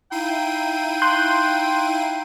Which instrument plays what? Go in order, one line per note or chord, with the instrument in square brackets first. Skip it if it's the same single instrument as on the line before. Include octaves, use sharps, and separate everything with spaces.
[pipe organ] D#4 F5 [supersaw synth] E4 D#7 [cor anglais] G5
[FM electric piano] C6 F#6 G6